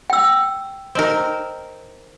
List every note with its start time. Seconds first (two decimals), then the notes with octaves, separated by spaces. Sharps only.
0.10 G5 E6
0.95 C4 D#4 A#4